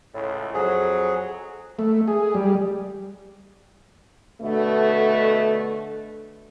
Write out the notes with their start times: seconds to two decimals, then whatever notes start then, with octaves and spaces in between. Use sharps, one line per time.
0.14 C#2 A2
0.54 F2 F#3 G#4
1.79 A3
2.08 G#4
2.34 G3
4.41 B2 D3 A3